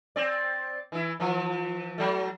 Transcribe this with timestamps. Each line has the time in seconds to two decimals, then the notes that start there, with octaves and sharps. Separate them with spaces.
0.16 C4 D5
0.92 E3 E4
1.20 E3 F3
1.98 F#3 A3